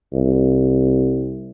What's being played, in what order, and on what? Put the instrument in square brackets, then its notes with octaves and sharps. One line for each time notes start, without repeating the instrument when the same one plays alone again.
[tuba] C2